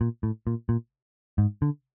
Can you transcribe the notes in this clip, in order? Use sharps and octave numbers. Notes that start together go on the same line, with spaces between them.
A#2
A2
A#2
A#2
G#2
D3